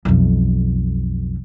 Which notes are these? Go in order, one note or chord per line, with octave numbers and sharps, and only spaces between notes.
B1 F2